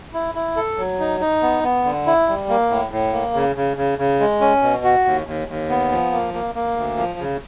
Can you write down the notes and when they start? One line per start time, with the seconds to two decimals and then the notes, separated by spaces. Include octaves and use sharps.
0.14 E4
0.35 E4
0.56 A4
0.78 F#3
0.99 D#4
1.20 D#4
1.42 B3
1.63 B3
1.85 D3
2.06 E4
2.28 G3
2.49 A#3
2.71 A2
2.92 A2
3.13 A#3
3.34 C#3
3.56 C#3
3.77 C#3
3.99 C#3
4.20 G#3
4.41 C#4
4.62 B2
4.84 F#4
5.05 D#2
5.27 D#2
5.48 D#2
5.69 B3
5.91 F3
6.12 A#3
6.34 A#3
6.55 A#3
6.76 D2
6.98 F3
7.19 C#3